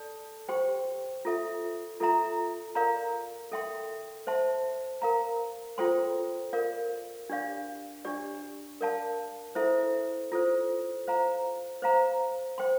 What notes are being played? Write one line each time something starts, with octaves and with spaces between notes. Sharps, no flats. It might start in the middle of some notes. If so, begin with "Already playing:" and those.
Already playing: A4 D5 A5
G4 C5 G5 C6
F4 A4 E5
F4 A4 E5 A#5
A#4 D5 F5 A#5
A4 E5 G5 C6
C5 E5 A5 C6
A#4 F5 A#5
F4 A4 C5 G5 C6
A#4 D5 F5
D4 G4 D5 F5
D4 G4 D5
A#4 D5 F5 A5
E4 A4 C5 E5
F4 A4 C5
C5 F5 A#5
C5 F5 A#5
C5 G5 C6